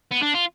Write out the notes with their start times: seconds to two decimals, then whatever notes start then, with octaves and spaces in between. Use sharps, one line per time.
0.12 B3
0.23 D4
0.35 F4